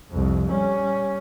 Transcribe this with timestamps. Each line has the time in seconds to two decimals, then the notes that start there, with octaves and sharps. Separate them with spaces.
0.11 C2 F2
0.48 G3 C#4